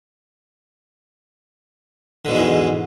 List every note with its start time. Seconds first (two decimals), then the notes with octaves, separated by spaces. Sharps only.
2.25 D3
2.28 B2
2.32 G#2
2.35 E3
2.38 E2